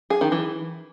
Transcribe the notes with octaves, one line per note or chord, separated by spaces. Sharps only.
G#4
D#3
E3